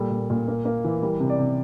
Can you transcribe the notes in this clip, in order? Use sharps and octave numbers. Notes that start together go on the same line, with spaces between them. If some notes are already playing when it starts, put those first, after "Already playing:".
Already playing: A#2 G3 A4
A#2
A#2
A#3
A#3
E3
G3 A#4
C3
D5
C3